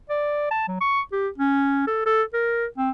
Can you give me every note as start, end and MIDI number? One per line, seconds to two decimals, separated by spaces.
0.10 0.48 74
0.51 0.64 81
0.68 0.79 54
0.81 1.01 85
1.12 1.28 67
1.38 1.82 61
1.87 2.03 69
2.06 2.23 69
2.34 2.66 70
2.78 2.90 60